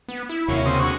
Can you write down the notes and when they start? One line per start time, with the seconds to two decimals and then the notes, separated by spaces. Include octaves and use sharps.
0.08 B3
0.29 E4
0.48 D#2 C3 A#3 C#4 F#4
0.66 C#3 C4 D#6
0.80 D3 G#3 F#4 C#6